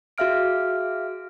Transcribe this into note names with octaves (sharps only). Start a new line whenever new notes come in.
F#4 G#4 E5 F5 F6 D7